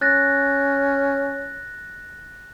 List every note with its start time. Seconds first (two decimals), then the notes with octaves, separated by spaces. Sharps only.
0.01 C#4 F#6 A6 A#6